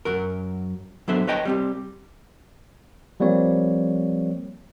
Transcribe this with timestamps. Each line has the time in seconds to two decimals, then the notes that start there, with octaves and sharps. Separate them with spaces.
0.05 F#2 F#3 A#4
1.08 F#3 B3 D4 A4 C5 E5
1.27 B4 C#5 D#5 G5 A5 A#5
1.45 G3 C4 G4
3.20 F3 G3 A#3 C4 C#5